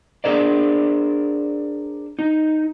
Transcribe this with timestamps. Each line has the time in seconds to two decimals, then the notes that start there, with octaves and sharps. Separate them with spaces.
0.24 D4 G#4 A#4 C5 D5
2.19 D#4